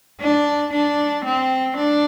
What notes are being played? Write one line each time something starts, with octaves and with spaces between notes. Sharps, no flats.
D4
D4
C4
D4